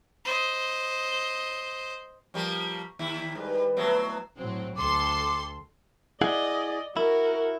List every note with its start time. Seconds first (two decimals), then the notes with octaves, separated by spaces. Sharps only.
0.25 C5 D#5
2.34 F3 G3 A#3 C#6
2.99 D#2 E4
3.35 G#2 D#3 G3 B4
3.55 G3
3.77 F#3 A3 B3 C4 E4
4.37 A2 F#3 C4
4.77 D2 A4 C6 D6
6.22 E4 G#4 D5 D#5 F#5
6.97 E4 F#4 A#4